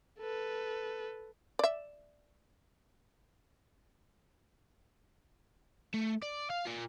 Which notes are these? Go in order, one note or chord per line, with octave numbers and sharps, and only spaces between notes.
A4 B4
D5 E5
A3
D5
F5
A#3 F4